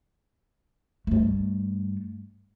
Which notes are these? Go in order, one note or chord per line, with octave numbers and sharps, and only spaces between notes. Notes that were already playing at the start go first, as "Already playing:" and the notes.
G2 A3